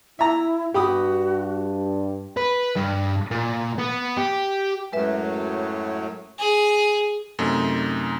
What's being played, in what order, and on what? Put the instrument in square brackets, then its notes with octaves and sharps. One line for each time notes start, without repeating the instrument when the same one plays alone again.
[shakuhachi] E4 [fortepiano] E5 A#5
[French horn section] G2 [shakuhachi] F#4 [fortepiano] G4 B5 D#6
[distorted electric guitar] B4
G2
A#2
B3
G4
[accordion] F#2 A2 F#3 [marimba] G#3 B4 E5
[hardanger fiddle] G#4
[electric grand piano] F#2 C3 A3 D#4 D#5